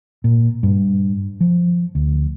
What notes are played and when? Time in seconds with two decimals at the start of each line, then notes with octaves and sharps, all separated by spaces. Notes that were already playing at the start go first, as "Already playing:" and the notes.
0.24 A#2
0.63 G2
1.41 F3
1.95 D2